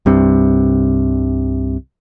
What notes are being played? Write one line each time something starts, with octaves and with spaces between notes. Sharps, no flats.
C2 G2 C3